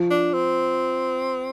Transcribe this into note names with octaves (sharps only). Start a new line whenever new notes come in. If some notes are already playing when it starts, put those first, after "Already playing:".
Already playing: F3
D4
C4